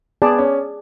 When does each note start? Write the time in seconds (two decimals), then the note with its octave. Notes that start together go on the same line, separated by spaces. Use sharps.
0.22 B3 G#4 D5 A5
0.38 C#4